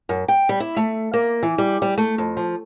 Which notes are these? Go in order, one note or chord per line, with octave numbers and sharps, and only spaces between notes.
F#2
G5
G3
E4
A3
A#3
E3
G3
G3
A3
F2
F3